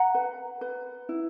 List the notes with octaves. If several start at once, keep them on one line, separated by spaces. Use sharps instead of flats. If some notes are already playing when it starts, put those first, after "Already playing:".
Already playing: F#5 A#5
B4
B4
E4